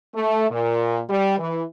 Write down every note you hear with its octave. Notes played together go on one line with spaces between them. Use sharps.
A3
A#2
G3
E3